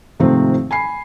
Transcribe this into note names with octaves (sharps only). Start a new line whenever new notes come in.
G#2 C3 D#3 F3 A3 C4
G#5 B5 C7